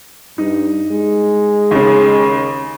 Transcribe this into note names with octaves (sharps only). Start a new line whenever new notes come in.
G2 D#4
G#3
D#2 C#3